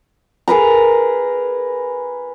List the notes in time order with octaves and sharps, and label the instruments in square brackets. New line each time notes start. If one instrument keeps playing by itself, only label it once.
[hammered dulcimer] G#4 A#4 B4 A#5